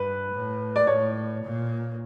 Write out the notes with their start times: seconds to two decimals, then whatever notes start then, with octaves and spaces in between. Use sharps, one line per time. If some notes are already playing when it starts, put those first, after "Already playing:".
Already playing: G2 B4
0.32 A2
0.76 D5
0.87 A2 C#5
1.43 A#2